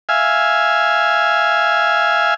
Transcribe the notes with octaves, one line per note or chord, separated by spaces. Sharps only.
E5 F5 G#5